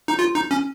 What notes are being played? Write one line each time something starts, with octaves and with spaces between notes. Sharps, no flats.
D#4
F4
D#4
C#4